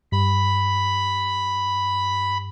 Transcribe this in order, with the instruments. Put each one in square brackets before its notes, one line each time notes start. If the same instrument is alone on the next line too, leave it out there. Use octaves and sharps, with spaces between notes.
[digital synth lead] G2 [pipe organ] B5